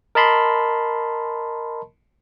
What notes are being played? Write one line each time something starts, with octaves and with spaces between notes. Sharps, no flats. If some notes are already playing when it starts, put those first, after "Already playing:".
A#4 D#5 A5 B5 C6